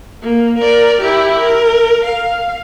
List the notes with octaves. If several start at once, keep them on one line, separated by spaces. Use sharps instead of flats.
A#3
A#4 D5
E4 G4
A#4
F5